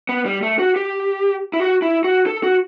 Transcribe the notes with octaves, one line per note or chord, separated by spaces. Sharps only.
B3
G3
A3
F#4
G4
E4
F#4
E4
F#4
A4
F#4